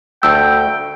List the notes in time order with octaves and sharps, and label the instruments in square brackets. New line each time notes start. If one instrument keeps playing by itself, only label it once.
[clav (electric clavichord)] D2 A3 [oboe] G5 [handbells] E6